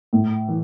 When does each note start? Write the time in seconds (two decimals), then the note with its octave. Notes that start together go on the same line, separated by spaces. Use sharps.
0.13 A2
0.48 E3